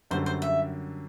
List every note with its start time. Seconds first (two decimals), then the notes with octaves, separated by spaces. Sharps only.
0.11 F#2 D3 G3 C5
0.26 C5
0.42 E5